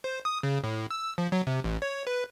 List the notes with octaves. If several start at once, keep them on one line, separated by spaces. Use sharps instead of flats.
C5
D#6
C#3
A2
E6
F3
F#3
C3
A1
C#5
B4